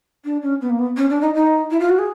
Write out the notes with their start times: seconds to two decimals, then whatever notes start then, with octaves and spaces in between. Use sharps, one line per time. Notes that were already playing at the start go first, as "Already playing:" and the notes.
0.24 D4
0.42 C#4
0.61 B3
0.69 A#3
0.78 B3
0.96 C#4
1.10 D4
1.21 D#4
1.34 D#4
1.70 E4
1.79 F4
1.89 F#4
1.98 G#4